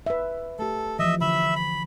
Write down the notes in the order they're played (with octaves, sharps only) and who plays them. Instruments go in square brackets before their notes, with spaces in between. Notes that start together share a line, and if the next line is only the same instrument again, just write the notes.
[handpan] B4 E5
[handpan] A3 G4 [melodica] A4
[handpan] E3 F3 [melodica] D#5 E5
[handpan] D3 [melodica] E5 B5
[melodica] B5